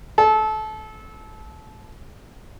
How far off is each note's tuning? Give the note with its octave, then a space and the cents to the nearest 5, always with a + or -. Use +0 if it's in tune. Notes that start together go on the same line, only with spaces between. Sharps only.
A4 -25